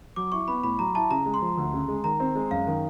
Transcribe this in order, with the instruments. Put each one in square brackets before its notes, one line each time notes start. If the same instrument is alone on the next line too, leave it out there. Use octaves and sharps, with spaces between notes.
[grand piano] F#3 [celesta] D6
[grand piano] E4 [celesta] C#6
[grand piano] B3 [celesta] B5
[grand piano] A2 [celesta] B5
[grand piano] F#3 [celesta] A#5
[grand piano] E4 [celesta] A5
[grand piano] C#3 [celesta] A#5
[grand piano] G#3
[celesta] C6
[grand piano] F3
D2
C#3
G#3
[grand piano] D#3 [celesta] A#5
[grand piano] C4
G#3
[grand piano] F#2 [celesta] F5
[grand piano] D#3